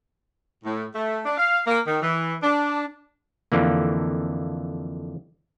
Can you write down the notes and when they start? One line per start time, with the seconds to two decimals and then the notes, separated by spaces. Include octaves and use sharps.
0.65 A2
0.95 A3
1.26 D4
1.38 F5
1.67 A#3
1.87 D#3
2.02 E3
2.43 D4
3.52 F2 D3 E3 A#3